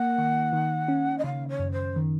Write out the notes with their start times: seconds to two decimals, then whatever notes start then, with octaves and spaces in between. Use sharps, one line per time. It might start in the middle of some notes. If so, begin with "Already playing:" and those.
Already playing: A#3 F#5
0.18 D#3
0.53 D#3
0.88 C#4
1.18 D#5
1.24 C#3 F5
1.48 C#5
1.59 F#2
1.71 C5
1.96 D#3